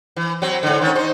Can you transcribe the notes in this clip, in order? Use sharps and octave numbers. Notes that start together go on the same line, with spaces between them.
E3
F#3 C4
G#2 D3
D#3 C#4
D#4 C5